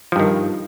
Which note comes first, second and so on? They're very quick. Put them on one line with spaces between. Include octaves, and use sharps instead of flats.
F3 G2 D#3